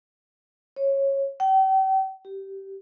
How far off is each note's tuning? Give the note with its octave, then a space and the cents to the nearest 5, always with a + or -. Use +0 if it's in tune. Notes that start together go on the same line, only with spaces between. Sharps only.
C#5 -15
G5 -40
G4 -15